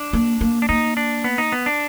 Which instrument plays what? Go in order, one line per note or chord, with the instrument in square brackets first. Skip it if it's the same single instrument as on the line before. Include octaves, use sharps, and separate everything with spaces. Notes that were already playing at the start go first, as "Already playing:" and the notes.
Already playing: [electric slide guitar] D4
[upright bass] A#3
A#3
[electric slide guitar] D4
[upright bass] A#3 [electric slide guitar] D#4
[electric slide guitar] D4
B3
D#4
B3
D4